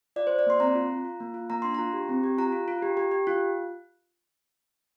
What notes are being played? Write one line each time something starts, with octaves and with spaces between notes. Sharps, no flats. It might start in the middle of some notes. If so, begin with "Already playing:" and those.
F4 D5
F4 C5
D5
A#3 C6
C4 A#5
F4
F4
F4
A#3
F4
A#3 A#5
D4 C6
F4 A#5
G4
C4
G4
F4 A#5
F4
F4
G4
G4
G4
F4